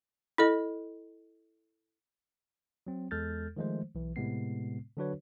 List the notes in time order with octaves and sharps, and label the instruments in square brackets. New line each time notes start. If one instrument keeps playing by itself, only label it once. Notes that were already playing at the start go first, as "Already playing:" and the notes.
[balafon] E4 A4 D#5
[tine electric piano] F#3 C4
E2 G#3 A4 F6 G6 A6
D#3 F3 G#3 A3 C5
B1 E3
A2 C3 G#3 B3 C7
D3 F#3 D4 F#4 B4 C#5